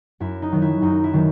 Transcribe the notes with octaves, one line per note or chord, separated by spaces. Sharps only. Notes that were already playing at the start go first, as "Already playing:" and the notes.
F#2 E4
D#4
D#3 F#3
E4
F#2 D#4
E4
D#3 F#3